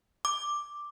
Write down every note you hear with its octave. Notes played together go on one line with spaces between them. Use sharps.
D6